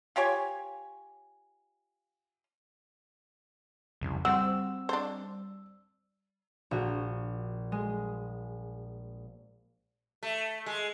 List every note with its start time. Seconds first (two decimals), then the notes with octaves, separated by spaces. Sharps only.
0.16 F4 G4 C#5 G#5
4.01 C2 F2 C#3
4.25 G3 C4 F#4 E6
4.89 D4 C5
6.71 A#1 F#4
7.72 G#3
10.23 A3
10.66 G#3